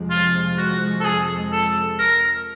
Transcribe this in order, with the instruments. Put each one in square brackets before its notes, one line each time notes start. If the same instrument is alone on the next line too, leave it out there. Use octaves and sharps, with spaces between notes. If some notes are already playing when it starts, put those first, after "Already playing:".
Already playing: [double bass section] F2 C3 F3 G#3
[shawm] F4
F#4
A4
G#4
A4
A#4